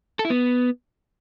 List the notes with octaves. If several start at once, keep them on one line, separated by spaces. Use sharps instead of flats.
A4
E4
B3